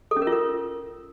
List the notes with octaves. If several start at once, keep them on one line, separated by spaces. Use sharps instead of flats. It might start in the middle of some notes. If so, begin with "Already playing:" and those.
A4
C#4
A#4
F4
A#4